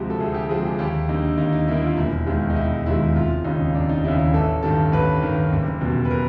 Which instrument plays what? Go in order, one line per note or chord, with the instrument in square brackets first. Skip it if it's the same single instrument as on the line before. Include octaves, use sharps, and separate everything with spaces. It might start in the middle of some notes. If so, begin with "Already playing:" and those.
Already playing: [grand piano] D2 C3 F3 G#3 F#4 G4
A4
D2 G#4
G4
C3 F3 G#3 G#4
G4
D#2 G4
D3 G3 A#3 D#4
D#2 D#4
D#4
D3 G3 A#3 E4
F4
E1 E4
D#2 D#3 G#3
D#4
E1 E4
D#2 D#3 G#3 E4
F1 F4
D#2 C#3 D#4
F1 D4
D#4
D#2 C#3 E4
E4
A1 A4
G2 D#3 G3 A4
A1 B4
G2 D#3 G3 A#4
F#1
E2 B2 G3
B4
A#4